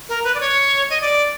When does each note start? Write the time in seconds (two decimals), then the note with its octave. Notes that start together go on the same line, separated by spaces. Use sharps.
0.09 A#4
0.24 B4
0.35 D5
0.40 C#5
0.90 D#5
1.01 D5